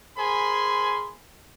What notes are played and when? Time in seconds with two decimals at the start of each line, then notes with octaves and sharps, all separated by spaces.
0.18 G#4 A#4 C5 G#5 B5 C6